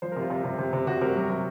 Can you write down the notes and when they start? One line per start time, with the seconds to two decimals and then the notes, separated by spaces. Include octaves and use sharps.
0.02 F3 C5
0.12 A#4
0.16 C3 F4
0.30 C3
0.45 C3
0.59 C3
0.73 C3
0.87 C3 F#4
1.01 C3 A#4
1.16 F#3
1.30 C3